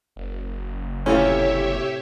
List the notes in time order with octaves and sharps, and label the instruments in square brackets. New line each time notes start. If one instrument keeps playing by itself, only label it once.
[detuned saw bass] F#1
[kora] A2 C3 E3 [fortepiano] C#4 F4 [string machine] G4 C#5 E5